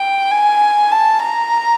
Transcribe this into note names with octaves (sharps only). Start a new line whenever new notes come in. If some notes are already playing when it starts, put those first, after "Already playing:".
Already playing: G5
G#5
A5
A#5